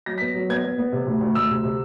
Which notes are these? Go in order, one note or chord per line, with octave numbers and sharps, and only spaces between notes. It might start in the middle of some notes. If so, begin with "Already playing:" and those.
F#3 A#6
B6
B3
F#3
B3 G#6
B3
B3
C3
D2
D2
D2 E6
C3
C3